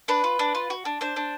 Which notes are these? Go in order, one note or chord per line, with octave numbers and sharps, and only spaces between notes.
D4 B4
F4
D4
F4
F#4
D4
D4 C5
D4